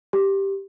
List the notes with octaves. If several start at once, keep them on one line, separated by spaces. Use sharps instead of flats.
G4